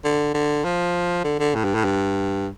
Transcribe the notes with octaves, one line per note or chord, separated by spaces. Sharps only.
D3
D3
F3
D3
D3
A2
G2
A2
G2